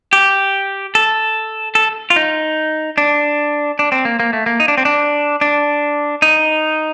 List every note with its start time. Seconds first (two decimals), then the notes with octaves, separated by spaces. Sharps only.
0.13 G4
0.95 A4
1.75 A4
2.10 F4
2.16 D#4
2.98 D4
3.79 D4
3.92 C4
4.05 A#3
4.20 A#3
4.33 A3
4.46 A#3
4.60 D#4
4.68 D4
4.78 C4
4.85 D4
5.41 D4
6.22 D#4